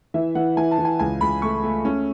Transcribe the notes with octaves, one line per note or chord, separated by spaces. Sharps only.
E3 E5
E3 F#5
E3 G#5
A5
E3
G#5
C#2 G#5
C#2 B5
A3 C#6
A3
C#4